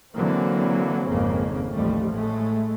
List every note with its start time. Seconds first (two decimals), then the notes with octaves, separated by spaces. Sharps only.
0.15 D3 E3 F#3 A#3 C4
1.08 G#1 F2 C#3 A#3
1.72 A1 D#2 F3 G3 A3
2.11 A2 G#3 A3